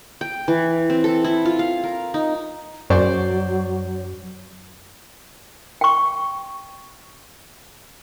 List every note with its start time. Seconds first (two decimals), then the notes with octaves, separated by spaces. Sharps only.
0.21 G5
0.48 E3
0.90 C4
1.04 A4
1.24 E4
1.45 F4
1.59 F5
1.84 A#4
2.14 D#4
2.90 F#2 F#3 C5 D5 C#6
5.81 G5 C#6